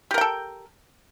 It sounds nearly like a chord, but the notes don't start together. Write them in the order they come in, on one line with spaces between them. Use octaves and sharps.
G4 A#4 G5 A4